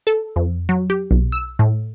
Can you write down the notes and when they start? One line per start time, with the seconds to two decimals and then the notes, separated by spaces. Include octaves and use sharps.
0.07 A4
0.36 F2
0.69 F#3
0.90 G4
1.11 B1
1.32 E6
1.59 A2